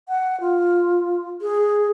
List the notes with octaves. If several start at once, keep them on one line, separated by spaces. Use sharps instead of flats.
F#5
F4
G#4